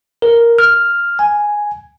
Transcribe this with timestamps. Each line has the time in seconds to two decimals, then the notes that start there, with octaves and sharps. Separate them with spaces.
0.22 A#4
0.59 F6
1.19 G#5